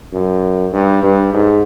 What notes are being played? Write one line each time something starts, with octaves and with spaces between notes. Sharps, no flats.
F#2
G2
G2
G#2